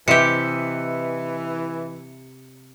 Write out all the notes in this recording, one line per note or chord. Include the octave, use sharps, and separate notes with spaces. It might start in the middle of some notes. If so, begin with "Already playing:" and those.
C3 E3 G4 B4 D#5 E5 C#7